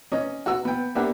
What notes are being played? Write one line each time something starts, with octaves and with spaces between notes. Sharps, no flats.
C#4 D#5
F#4 E6
B3 G5
A#3 B3 D4 G4 E5 F#5